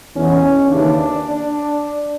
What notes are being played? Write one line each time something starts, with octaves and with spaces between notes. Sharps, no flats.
E2 B2 C#4
D#2 C#3 E3 D4